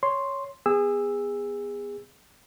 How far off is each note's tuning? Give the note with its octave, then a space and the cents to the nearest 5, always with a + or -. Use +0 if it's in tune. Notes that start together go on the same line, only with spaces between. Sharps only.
C#5 +0 C6 +0
B3 +0 G#4 -25 E6 +0